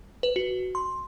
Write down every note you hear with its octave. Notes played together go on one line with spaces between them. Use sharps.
B4
F#4
C6